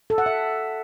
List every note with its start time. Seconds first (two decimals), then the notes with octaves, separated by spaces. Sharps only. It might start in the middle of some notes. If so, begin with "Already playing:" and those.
0.10 A4
0.18 F#5
0.26 E5